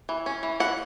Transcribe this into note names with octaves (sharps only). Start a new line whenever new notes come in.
E3
C#4
E3
E3 F#5